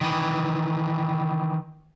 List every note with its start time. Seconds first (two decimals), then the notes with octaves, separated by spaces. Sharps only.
0.01 D#3 E3